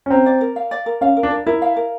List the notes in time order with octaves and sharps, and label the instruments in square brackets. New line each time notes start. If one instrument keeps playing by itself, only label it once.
[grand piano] C#4
[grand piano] C4 [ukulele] A#5
[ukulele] D5
A#4
F5
D5
A#4
[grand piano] C#4 [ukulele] F5
[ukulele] A#4
[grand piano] D4
[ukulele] A#4
[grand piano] E4 [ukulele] A#4
[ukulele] F5
A#4